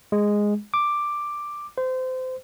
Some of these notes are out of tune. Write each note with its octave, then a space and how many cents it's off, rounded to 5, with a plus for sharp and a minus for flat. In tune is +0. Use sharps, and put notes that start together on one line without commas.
G#3 -5
D6 +5
C5 -25